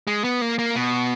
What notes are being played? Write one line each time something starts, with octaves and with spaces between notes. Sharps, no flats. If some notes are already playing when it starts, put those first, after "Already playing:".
G#3
B3
A#3
A#3
B2